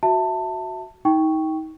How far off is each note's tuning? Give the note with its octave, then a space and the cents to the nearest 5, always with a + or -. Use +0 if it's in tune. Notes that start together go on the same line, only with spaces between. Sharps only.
F#4 +0 E5 +0 A5 +20
D#4 +30 G5 +0 C#6 +0